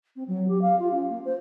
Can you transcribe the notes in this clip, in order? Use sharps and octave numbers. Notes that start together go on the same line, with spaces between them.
C4
F#3
G4
F5
F4
C#4
A#3
C5